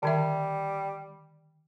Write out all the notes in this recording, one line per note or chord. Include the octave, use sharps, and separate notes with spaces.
D3 D#3 G3 E5